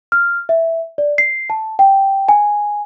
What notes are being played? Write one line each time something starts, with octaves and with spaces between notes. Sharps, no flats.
F6
E5
D5
C7
A5
G5
G#5